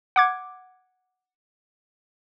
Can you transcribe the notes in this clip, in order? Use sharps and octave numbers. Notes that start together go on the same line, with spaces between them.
F#5 D6 G#6